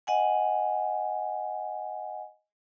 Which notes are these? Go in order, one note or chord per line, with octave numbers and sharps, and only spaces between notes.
D#5 F#5 G#5